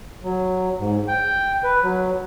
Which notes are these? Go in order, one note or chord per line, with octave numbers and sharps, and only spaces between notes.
F#3
G#2
G5
B4
F#3